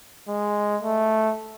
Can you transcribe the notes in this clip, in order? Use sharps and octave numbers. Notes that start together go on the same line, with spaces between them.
G#3
A3